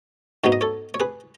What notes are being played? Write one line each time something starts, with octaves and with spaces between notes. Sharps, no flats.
G#2 F#3 B3 D#4 C#5
D#5
A4 C#5
C#5
G#4 B4